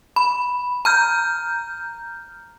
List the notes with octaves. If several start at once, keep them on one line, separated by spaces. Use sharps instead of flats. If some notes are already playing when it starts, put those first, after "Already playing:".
B5
A#5 F6 G6